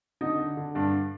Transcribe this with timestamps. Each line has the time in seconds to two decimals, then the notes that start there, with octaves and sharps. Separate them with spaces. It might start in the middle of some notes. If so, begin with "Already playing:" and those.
0.21 D3 D#4
0.39 D3
0.57 D3
0.75 G2 D4